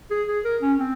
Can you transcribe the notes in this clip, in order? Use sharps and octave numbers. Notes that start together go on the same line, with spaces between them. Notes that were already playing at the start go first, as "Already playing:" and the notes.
G#4
G#4
A#4
C#4
C4